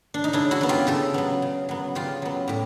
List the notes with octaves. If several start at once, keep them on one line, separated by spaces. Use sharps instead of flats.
D4
D#4
C#3 D4 E4
E4 F#4
F#3 B3
F4 G4
C#3 G4 A4
F#3 B3
C#3
F#3 B3
C#3 F4 G4
F#3 B3
A2 G4